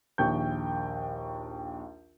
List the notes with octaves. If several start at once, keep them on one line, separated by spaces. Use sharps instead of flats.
A#1 D#2 G5 C#6 G6